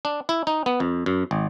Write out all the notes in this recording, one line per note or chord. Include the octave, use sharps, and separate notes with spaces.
D4
E4
D#4
B3
F2
F#2
G#1